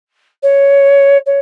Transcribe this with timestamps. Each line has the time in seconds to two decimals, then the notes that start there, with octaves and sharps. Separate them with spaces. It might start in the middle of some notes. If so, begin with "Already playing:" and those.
0.43 C#5
1.26 C#5